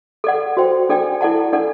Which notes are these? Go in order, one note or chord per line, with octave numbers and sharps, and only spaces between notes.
A4 D5 F#5
F#4 C5 G5
D4 A4 D5 G5
E4 A4 D5 F#5 A5
D4 A4 D5 F#5